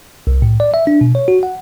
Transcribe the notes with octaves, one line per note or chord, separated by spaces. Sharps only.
C2
A2
D5
E5
D4
B2
C#5
F#4
F#5